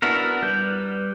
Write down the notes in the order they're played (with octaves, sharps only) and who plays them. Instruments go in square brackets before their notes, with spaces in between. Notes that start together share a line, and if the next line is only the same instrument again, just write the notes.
[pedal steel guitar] B3 D4 E4 F#4 A#4
G3 B4 G6